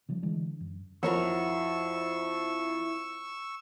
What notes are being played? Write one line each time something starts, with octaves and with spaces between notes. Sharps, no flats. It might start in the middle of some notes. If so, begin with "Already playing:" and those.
C#3 F3 G3
D3 E3 G#3 D4
F#2
F2 E4 F#4 A#4 C#5 C#6 E6